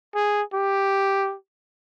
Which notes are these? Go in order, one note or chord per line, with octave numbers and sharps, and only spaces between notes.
G#4
G4